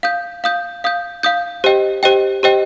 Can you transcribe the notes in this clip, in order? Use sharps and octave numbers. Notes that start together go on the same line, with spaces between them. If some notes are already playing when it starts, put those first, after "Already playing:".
F5 D#6 G6
F5 D#6 G6
F5 D#6 G6
F5 D#6 G6
G4 C5 D#5 G5
G4 C5 D#5 G5
G4 C5 D#5 G5